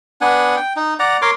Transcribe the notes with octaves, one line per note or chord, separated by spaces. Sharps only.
B3 D4 F#5 G#5
G5
D#4
D5 F#5 A#5
A#4 C#5 C6 D6